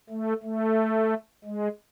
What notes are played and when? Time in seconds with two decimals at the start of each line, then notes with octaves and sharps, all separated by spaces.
0.10 A3
0.43 A3
1.45 G#3